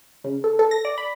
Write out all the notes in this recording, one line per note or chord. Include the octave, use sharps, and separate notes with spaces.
C#3
A4
A4
A#6
D5
B5